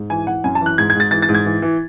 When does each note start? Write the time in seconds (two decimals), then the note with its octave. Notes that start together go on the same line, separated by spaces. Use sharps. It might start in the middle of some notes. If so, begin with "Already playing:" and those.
Already playing: G#2
0.10 E3 G#5
0.27 E3 F#5
0.44 F#2 G#5
0.55 A5
0.61 E3
0.66 F#6
0.78 G#2 G#6
0.90 G#6
0.95 G#2 A6
1.11 E3 A6
1.22 A6
1.29 G#2
1.35 G#6
1.46 E3
1.62 E3